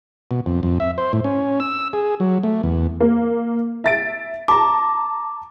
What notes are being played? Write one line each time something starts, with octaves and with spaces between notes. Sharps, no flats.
B2
F2
F2
E5
C5
A2
C#4
E6
G#4
F#3
A3
E2
A#3
E5 A6 D7
A5 A#5 D6